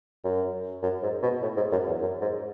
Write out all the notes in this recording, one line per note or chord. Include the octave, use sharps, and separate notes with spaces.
F#2
F#2
G#2
B2
A2
G#2
F#2
E2
F#2
G#2